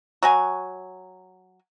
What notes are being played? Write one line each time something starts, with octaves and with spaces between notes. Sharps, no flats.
F#3 F#4 G#5